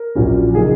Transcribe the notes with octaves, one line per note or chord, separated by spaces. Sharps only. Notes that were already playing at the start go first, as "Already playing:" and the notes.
Already playing: A#4
A#1 A#2 F#3 C#4
C#3 F#3 A#3 D#4 G#4